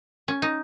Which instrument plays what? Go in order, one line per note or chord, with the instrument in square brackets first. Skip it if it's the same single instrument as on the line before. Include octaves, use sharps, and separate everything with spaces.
[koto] C#4
D#4